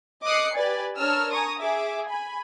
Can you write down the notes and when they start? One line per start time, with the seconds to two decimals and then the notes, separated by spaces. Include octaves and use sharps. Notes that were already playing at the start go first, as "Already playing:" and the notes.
0.24 D#5 D6 D#6 F#6 C7 C#7
0.55 G4 B4 D5 G#5
0.98 D4 A#4 C#5 A5 E6 F6
1.31 G#5 A#5 C#6 D#6
1.60 G#4 E5 D6
2.08 G#5 B5